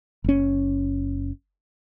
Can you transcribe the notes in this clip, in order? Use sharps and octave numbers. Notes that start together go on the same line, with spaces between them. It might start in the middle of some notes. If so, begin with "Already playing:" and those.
F#1 C#4